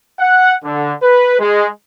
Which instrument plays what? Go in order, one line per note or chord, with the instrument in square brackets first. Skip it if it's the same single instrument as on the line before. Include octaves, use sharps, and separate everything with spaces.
[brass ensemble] F#5
D3
B4
G#3